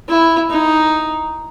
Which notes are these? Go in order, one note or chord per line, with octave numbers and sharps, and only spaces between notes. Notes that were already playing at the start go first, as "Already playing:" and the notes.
E4
D#4